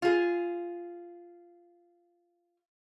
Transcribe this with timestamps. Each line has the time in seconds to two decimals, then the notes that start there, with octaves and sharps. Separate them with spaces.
0.02 F4 G#4